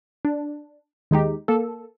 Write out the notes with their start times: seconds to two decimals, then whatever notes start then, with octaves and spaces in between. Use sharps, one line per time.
0.25 D4
1.11 D#2 G#3 D#4 G4
1.48 A#3 A4